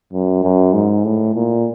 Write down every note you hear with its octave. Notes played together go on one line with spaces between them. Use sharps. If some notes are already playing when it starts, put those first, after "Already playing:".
F#2
F#2
G#2
A2
A#2